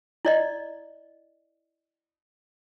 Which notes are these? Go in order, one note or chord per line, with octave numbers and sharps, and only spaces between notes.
E4 D5 D#5